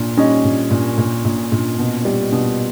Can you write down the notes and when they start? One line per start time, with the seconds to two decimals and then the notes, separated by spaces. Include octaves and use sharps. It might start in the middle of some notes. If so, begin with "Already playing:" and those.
Already playing: A#2
0.17 G3 C#4 D#4
0.44 A#2
0.71 A#2
0.98 A#2
1.25 A#2
1.52 A#2
1.78 B2
2.05 G3
2.32 B2